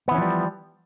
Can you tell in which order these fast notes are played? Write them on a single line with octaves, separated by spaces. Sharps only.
B3 E3 C#4 F3 G3